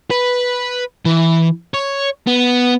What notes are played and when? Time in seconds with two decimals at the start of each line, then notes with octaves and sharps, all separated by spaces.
0.10 B4
1.05 E3
1.74 C#5
2.27 B3